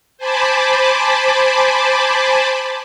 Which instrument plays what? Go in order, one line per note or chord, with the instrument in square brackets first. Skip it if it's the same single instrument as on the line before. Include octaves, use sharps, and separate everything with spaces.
[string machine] C5 G#5 A5 B5 D6